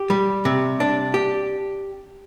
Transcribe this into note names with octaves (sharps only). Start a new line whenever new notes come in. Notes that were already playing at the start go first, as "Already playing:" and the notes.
Already playing: G4
G3
C3
D4
G4